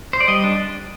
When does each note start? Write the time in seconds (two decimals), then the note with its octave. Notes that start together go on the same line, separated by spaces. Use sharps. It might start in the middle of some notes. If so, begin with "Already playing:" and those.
0.13 C5
0.20 D5
0.28 G3 D#5
0.44 D4